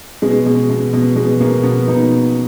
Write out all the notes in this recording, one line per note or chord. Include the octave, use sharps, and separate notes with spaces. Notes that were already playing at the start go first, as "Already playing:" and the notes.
B2 G#3
B2
B2
B2
B2 G#3
B2 A#3
B2 B3
B2 D#4